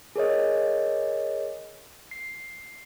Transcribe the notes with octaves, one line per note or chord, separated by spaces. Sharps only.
G#4 A#4 C#5 D#5
C7